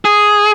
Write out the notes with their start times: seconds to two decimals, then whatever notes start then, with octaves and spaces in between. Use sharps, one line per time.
0.05 G#4